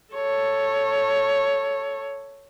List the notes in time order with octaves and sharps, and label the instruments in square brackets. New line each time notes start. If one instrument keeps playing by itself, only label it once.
[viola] A4 C#5